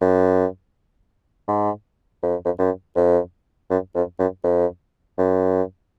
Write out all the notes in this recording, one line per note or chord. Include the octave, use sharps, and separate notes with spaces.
F#2
G#2
F2
F2
F#2
F2
F#2
F2
F#2
F2
F#2